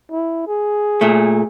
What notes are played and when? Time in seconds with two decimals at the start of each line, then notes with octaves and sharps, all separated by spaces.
0.12 E4
0.47 G#4
1.01 A#2 A3